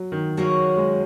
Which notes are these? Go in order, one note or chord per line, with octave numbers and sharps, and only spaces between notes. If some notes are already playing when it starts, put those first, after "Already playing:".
Already playing: F#3
D#3
C#3 F#3 A#3 C#4 F#4
G#3